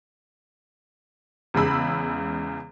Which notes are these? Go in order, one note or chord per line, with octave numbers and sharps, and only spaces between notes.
E2 C#3 G#3 B5 E6